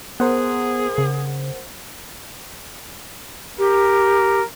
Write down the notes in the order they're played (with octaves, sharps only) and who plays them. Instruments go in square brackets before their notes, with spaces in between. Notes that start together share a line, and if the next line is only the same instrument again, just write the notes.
[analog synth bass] B3 [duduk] G#4 [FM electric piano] A#4 C5 F#5
[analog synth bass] C#3
[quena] G4 [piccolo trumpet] A#4